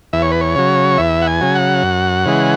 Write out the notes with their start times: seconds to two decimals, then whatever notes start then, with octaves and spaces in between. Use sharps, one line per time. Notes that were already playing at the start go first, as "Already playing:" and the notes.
0.13 E2 E5
0.22 C#5
0.32 B4
0.41 C#5
0.55 C#3 F#3
0.98 E2 E5
1.22 F#5
1.27 G#5
1.41 C#3 F#3
1.55 F#5
1.83 F#2
2.26 C#3 E3 G#3